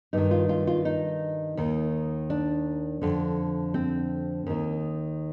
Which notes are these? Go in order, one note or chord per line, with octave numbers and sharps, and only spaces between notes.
G2 D#3 D#4
F4
F4
F4
D#4
D#2 D#3
D4
F2 D3
C4
D#2 D#3